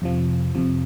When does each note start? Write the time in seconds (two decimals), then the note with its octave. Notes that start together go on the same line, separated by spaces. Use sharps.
0.02 F2 C3 F3
0.55 F2 C3 F3